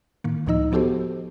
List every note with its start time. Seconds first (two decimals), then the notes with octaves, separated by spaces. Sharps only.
0.24 A2 D#3 A#3
0.47 C#2 A2 F3 D#4 D#5 E6
0.72 F3 B3 F#4 G4 A4 C5